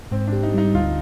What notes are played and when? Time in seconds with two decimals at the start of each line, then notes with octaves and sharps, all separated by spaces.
0.12 G#2 C4
0.28 D4 G4
0.43 D#4
0.54 G3 D#4
0.74 D2 F4